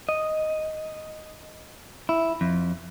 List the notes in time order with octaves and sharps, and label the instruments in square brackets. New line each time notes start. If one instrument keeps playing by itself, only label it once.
[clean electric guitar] D#5
E4
F2